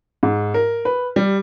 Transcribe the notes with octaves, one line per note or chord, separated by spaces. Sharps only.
G#2
A#4
B4
G3